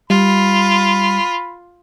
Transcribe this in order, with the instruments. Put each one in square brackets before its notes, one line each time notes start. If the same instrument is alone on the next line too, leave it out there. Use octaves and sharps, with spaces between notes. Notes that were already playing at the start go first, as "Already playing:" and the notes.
[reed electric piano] G3 [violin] F4 [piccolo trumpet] B5